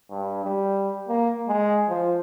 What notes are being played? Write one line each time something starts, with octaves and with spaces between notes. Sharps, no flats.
G2
G3
A#3
G#3
F3